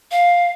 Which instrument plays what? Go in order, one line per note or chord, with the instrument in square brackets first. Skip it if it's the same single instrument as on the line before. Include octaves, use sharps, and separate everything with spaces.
[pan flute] F5